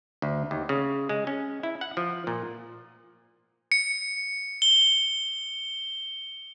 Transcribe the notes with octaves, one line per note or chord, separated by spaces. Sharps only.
D2
D#2
C#3
G#3
C#4
E4
F#5
F3
A#2
C#7
G7